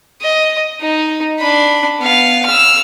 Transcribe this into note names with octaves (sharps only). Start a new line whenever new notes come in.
D#5
D#4
D4 B5
B3 F5
E6 F6